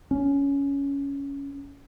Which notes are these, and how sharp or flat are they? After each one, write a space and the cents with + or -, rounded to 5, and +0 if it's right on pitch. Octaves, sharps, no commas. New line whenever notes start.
C#4 +10